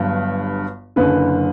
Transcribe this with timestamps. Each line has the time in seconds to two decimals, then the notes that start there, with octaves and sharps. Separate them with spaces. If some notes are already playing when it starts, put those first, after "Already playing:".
Already playing: G1 G2 F#3
0.96 F#1 F#2 D3 B4